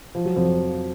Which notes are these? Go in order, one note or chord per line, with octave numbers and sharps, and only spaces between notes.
F3
F#3
F2 F3